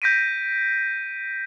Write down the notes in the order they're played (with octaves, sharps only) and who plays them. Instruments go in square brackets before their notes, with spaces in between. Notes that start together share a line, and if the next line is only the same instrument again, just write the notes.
[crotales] G6 A#6 B6 D7 D#7